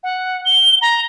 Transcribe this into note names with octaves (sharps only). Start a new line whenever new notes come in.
F#5
G7
A#5